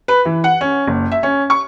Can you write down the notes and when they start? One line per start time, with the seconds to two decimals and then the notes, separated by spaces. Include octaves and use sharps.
0.08 B4
0.25 E3
0.44 F#5
0.61 C#4
0.87 F#1
1.12 E5
1.23 C#4
1.50 C#6